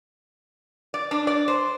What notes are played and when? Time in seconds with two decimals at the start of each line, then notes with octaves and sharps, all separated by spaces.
0.94 D5
1.11 D4
1.27 D5
1.48 C5